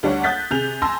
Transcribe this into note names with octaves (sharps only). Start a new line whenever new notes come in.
D2 G3 D4 C#5 F#5
D#6 F#6 G6 A6 B6
C3 G#4 G6 F7
G#5 A5 C6 E6 A#6